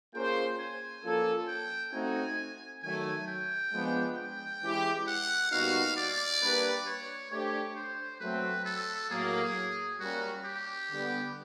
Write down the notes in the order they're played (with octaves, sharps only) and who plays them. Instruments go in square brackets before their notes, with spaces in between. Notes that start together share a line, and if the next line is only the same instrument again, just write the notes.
[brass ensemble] A#3 C#4 F4 G#4 C5 [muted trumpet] G5
[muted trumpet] G#5
[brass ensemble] F3 A#3 C#4 F4 A4
[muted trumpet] G5
[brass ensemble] A3 C4 D#4 F#4 [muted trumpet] G#5
[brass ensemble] D#3 F#3 A3 [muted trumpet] G#5
[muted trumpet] G5
[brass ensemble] F3 G#3 B3 D4
[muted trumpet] G5
[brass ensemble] E3 G#3 C#4 E4 G4
[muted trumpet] F#5
[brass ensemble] A#2 G3 B3 D#4 F#4 [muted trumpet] F5
[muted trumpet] D5
[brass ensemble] G3 A#3 D4 G4 B4
[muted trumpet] C#5
[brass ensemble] A3 D4 G4 C5 [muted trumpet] C#5
[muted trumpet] C5
[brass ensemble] F#3 A3 C4 [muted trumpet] B4
[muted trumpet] A4
[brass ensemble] A2 F#3 A#3 [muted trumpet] G#4
[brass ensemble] G3 A#3 C#4 [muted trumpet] F#4
[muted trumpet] G4
[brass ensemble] D3 G3 B3